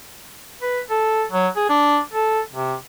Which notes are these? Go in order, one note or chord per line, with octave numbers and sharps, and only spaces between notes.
B4
A4
F#3
G#4
D4
A4
C3